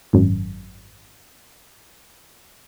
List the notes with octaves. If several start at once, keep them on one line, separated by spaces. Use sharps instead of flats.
G#1 F#2